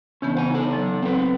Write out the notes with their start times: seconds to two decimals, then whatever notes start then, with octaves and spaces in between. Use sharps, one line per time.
0.22 C#3 E3 B3 C#4 D4
0.35 C5 F#5 G#5
0.50 D#4 A4
0.73 F#3
1.02 C4 B4